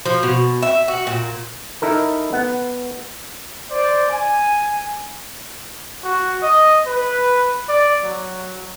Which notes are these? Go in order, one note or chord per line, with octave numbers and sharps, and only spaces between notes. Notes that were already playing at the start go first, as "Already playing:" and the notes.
F3
B2
E5
F#4
A#2
D#4 E4 A4 A#4
B3 F#5
C5 D5
G#5
F#4
D#5
B4
D5
F#3